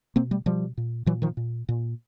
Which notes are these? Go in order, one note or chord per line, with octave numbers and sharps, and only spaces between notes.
B2 A#3 C4
G3 A3
B2 F3 G3
A#2
A#2 E3 F#3
D#3 F3
A#2
A#2